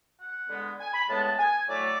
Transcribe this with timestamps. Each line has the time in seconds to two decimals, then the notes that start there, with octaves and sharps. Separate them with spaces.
0.20 F#5
0.49 D3 G#3 B3
0.80 G#5
0.94 B5
1.09 A2 G#3 B3 A5
1.24 A5
1.39 G#5
1.68 A2 F#3 A3 D5